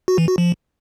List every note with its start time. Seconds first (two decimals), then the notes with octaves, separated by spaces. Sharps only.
0.08 F#4
0.18 E3
0.28 F#4
0.38 F3